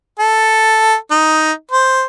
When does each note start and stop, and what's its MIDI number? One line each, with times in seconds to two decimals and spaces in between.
0.19 0.95 69
1.11 1.52 63
1.71 2.05 72